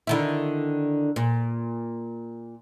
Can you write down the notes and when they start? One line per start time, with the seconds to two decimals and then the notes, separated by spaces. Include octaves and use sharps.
0.07 D3 D#3 E4
1.16 A#2